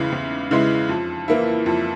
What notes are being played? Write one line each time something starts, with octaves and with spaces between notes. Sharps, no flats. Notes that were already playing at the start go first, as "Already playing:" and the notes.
Already playing: E2 C#3 E3 G#3 E4
E2
C#3 E3 G#3 E4
F2
E3 A#3 E4
F2